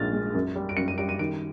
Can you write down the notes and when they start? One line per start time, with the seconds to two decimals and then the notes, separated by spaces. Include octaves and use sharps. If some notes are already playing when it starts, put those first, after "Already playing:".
Already playing: A#1 G#2 G#3 F6 A6
0.13 G#3
0.35 F#2
0.55 G3
0.69 D7
0.77 F#2 C#7
0.88 D#7
0.98 G3 D7
1.09 D#7
1.19 D#3 D7